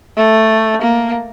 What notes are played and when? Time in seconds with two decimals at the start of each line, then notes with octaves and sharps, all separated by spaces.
0.17 A3
0.82 A#3